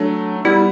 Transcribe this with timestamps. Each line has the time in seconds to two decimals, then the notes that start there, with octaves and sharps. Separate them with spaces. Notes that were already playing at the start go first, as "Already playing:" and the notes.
Already playing: F#3 A3 D4
0.45 G3 B3 E4